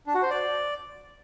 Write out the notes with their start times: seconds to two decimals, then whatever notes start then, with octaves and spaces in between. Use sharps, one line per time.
0.07 D4
0.15 F#4
0.22 C5
0.30 D5